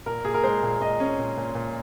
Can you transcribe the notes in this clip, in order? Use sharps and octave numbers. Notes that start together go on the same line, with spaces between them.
A#2 A#4
A#2 G#4
A#4
G#3 C5
A#2
A#2 D#5
C#4
A#2
A#2
A#2